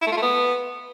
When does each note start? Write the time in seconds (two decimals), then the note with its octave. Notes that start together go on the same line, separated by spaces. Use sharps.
0.02 E4
0.07 A3
0.12 F4
0.17 A3
0.22 B3